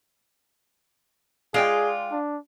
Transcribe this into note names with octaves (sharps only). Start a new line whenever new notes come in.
G#3 F4 G#4 D5 G5
D4